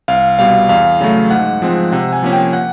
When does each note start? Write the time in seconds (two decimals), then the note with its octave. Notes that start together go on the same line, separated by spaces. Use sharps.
0.08 C2 F5
0.39 B2 G3 F5
0.69 E2 F5
1.00 C#3 F#3 A3
1.31 G#2 F#5
1.62 F3 G#3 C4
1.92 C3 F#5
2.13 G#5
2.23 F3 A#3 C#4
2.33 G5
2.53 F#5